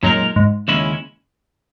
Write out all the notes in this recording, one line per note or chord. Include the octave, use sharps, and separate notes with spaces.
F#2 A#2 G#3 D#4 A#4
G#2
D#2 C#3 G#3 C#4 E4